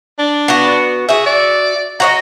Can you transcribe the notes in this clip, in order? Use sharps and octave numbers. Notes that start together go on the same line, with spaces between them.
D4
B3 F#4
F#4 G#4 E5
D5
F#4 C#5 D#5 A#5